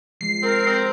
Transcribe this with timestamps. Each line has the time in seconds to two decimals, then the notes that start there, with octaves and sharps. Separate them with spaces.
0.21 F3 G#3 C7
0.43 C4 A#4
0.66 C4